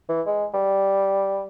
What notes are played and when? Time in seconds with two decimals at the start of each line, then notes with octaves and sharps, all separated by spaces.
0.09 E3
0.27 G#3
0.54 G3